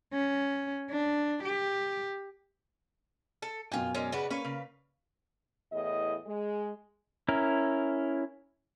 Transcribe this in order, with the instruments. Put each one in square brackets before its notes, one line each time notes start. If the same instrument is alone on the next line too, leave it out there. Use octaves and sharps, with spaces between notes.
[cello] C#4
D4
G4
[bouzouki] A4
[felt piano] F#2 B2 G#5 [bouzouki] F4 G5
[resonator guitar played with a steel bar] G#3 A#4 D5 [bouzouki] C#4
[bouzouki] C#3 F#4 B4 [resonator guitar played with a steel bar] B3 D5
[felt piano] A#3 [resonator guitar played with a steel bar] C#4 C#5 [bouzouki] B4 F5
[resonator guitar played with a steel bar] C#3
[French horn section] E2 A2 D#5
G#3
[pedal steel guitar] C#4 E4 A#4